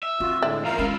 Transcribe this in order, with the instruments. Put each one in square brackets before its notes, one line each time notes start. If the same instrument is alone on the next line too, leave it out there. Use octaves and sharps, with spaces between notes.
[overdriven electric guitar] E5
[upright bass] C4 [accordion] F4 F#4
[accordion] A2 D3 G#3 [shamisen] D5 E5
[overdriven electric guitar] E2 F3 [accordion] A#4 F5 A#5
[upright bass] G#3 C#4 [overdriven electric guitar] E4 F4